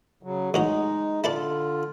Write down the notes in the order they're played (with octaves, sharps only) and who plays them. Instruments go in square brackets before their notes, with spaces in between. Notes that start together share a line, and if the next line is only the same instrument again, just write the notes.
[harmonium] C#3 F#3
[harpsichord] A1 F#3 D#5 [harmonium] G#3 D#4
[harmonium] D3 F4 [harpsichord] E4 A4 D5